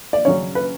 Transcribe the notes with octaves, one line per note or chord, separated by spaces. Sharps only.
D5
C#3 F#3 C#4 C#5
B4